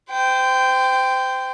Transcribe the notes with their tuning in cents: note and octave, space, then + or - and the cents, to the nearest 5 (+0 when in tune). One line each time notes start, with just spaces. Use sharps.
C5 -30 G5 +0